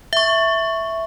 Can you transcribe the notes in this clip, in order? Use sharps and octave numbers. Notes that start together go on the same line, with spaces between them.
E5 C#6